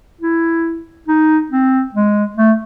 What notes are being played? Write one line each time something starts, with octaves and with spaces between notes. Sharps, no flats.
E4
D#4
C4
G#3
A3